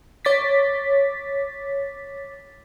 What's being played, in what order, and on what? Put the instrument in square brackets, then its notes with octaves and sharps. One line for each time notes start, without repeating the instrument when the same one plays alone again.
[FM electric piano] C#5 D6 A6 B6